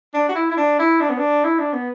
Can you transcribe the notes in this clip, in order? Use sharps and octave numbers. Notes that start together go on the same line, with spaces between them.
D4
F#4
E4
E4
D4
E4
D4
B3
D4
E4
D4
B3